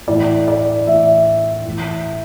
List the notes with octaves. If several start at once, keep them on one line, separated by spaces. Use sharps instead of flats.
A2 E3 D5
D5
A2 E3 E5
A2 E3